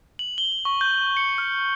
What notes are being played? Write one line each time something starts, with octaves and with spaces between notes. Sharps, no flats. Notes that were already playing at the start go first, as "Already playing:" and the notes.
F#7
G7
C#6
G6
C#7
F6